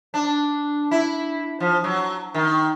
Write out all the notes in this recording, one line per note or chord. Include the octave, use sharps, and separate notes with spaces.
D4
E4
F3
F#3
D#3